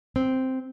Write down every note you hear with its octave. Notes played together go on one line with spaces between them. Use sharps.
C4